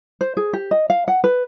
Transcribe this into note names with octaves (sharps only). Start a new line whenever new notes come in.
C5
G#4
G4
D#5
F5
F#5
B4